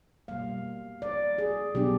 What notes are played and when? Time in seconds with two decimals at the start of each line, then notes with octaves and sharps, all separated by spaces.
0.28 B2 G3 A#3 F5
1.02 D5
1.38 G#4
1.75 B2 F#3 B3 D4 G4